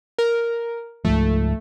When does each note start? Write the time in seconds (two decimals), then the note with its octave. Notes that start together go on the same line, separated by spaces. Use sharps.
0.19 A#4
1.05 C#2 G#2 F3 A3